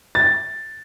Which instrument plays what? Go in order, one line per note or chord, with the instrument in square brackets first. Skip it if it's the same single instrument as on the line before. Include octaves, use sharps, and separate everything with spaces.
[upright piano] A6